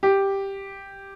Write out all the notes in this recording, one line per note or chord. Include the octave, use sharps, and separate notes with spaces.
G4